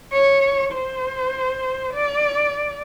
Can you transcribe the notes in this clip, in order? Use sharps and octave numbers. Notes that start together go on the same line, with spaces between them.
C#5
C5
D5